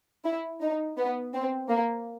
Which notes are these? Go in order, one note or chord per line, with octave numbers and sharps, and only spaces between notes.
E4
D#4
B3
C4
A#3